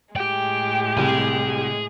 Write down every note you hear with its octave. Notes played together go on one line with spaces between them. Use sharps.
A2 G#3 G4 G5
C2 G#4 G#5